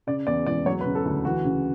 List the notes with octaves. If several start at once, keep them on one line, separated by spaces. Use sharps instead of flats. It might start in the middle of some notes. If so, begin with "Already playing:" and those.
C#3 D5
E2 D5
E1 D5
F#3 C#5
B4
C#3
A4
D2
E3 F#4
C#3